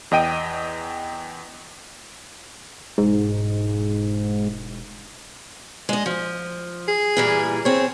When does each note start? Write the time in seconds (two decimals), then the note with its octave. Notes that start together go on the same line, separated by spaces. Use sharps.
0.11 E2 D#5 G5 D#7
2.98 E1 G#2
5.89 G#3 D#5
6.06 F3
6.88 G#4
7.17 A#2 E3 G3
7.65 C4 G#4 C#5